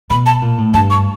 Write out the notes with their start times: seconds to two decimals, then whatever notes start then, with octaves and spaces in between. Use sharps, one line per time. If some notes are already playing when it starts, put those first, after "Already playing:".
0.10 B2 B5
0.26 A5
0.42 A#2
0.58 A2
0.74 G2 A5
0.90 C#6